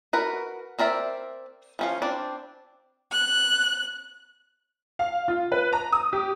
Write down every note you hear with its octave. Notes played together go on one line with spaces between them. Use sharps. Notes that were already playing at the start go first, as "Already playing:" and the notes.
F#4 A#4 B4
C4 A#4 D5 E5
F3 C#4 F4
C4 D4 D5
F#6
F5
F4
B4
A#5
D#6
G4